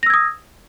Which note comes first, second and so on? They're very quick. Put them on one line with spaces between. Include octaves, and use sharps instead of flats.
A#6 E6 G#6 D#6